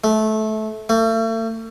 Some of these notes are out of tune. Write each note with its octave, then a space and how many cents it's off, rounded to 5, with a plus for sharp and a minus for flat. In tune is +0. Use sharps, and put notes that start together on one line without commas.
A3 -20
A3 +40